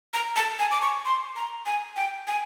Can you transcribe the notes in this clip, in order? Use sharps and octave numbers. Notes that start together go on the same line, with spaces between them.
A#5
A5
G#5
D6
C#6
C6
A#5
G#5
G5
G#5